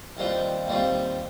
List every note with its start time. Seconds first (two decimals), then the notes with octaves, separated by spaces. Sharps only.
0.17 D#2 D#3 G3 C4 F4
0.67 D#2 D#3 G3 C4 F4